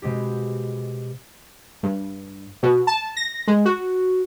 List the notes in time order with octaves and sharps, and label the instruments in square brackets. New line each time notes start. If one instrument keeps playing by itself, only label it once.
[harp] B2 G#3 C4 G4
[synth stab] G2
B2
A5
A#6
G#3
F#4